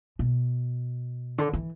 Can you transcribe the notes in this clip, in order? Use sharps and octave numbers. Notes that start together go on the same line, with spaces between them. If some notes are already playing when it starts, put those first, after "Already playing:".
B2
D3
E3